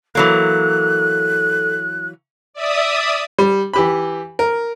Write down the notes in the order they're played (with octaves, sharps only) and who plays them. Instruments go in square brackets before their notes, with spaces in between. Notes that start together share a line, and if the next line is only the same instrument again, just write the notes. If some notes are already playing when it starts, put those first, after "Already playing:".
[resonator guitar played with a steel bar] E3 F#3 A#3 [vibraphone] A4 [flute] F#6
[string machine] D5 E5 D#6
[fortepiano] G3
E3 G4 B5
A#4